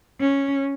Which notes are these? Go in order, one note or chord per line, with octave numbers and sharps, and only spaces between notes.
C#4